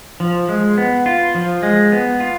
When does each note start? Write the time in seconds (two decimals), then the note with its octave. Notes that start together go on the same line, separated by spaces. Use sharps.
0.20 F3
0.49 G#3
0.77 B3
1.06 F4
1.35 F3
1.63 G#3
1.92 B3
2.20 F4